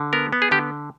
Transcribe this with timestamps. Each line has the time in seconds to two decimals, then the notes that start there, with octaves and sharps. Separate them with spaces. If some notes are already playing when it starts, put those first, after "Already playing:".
Already playing: D3
0.13 B3 A#4
0.33 B3
0.42 G#4
0.51 D3 G4